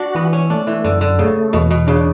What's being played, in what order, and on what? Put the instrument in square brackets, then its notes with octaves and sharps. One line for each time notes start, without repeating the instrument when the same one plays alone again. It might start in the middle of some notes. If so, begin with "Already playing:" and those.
Already playing: [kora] D4 [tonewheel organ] F#4
[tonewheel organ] E3 [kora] B3
[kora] C#4
[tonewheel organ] A3 [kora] D4
[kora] E3
[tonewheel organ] F#2 [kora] D3
[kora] D3
[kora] C#3 [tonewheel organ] A3
[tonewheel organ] E2 [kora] B2
[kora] B2
[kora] C#3 [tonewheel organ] D4